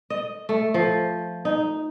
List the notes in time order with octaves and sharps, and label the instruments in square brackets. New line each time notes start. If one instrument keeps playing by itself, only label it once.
[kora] D#5
A3
F3
D#4